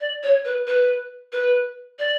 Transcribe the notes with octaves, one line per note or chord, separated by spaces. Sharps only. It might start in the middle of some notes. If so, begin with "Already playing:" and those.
D5
C#5
B4
B4
B4
D5